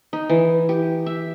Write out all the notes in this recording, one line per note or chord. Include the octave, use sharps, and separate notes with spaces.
D#4
E3
G4
E5